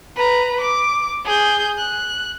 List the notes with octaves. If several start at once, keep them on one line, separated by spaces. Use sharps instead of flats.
B4 A#5
D6
G#4 G6
F#6